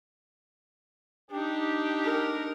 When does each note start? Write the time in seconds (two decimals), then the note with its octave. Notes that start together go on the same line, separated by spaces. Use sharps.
1.31 D4 D#4 G4
2.04 A#4